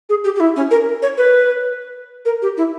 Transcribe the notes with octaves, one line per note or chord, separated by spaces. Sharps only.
G#4
G4
G4
E4
C#4
A#4
C#5
B4
A#4
G4
E4